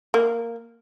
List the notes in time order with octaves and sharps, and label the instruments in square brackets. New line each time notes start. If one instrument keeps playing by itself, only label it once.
[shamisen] A#3